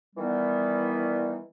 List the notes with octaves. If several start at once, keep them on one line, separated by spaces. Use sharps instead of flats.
D#3 E3 G3 B3